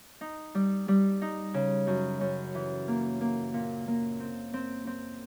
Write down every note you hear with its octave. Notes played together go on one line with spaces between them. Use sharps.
D#4
G3
G3
D#4
C#3
F#2
F#2
E3
A#3
A#3
A#2
A#3
C4
C4
C4